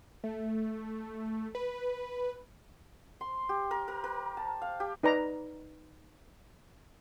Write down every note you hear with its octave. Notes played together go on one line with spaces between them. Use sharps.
A3
B4
C6
G4
A#4
A#4
A#4
A5
F5
G4
D#4 B4 D5 A#5